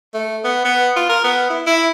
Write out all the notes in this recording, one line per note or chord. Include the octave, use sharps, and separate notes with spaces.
A3
B3
B3
F4
A#4
B3
E4
E4